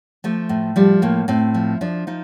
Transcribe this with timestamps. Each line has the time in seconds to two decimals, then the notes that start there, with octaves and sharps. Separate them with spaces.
0.24 F3 A3
0.49 A2
0.76 F3 G3
1.02 A2 A#3
1.28 A2 C4
1.54 F3
1.81 F3 D4
2.07 F3 D#4